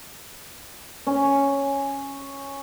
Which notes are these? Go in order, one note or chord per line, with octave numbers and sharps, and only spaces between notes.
C#4